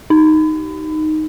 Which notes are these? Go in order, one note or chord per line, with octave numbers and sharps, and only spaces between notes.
D#4